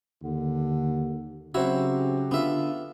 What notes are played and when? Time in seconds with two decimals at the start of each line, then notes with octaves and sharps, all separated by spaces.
0.23 D#2 D3
1.55 C#3 F#3 C4 E4 F#4 G4
2.31 D3 B3 F4 E5